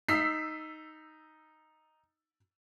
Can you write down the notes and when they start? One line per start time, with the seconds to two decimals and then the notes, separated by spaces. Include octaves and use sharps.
0.09 D#4 E6 B6 C7